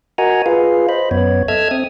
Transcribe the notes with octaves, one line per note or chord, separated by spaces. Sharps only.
F#4 A#4 D#5 F#5 G#5 A#5
F4 G#4 B4 F5
C5 D#5 B5
F#2 B3 C#5
A4 D#5 E5 E6 F6 G#6
C4 D#6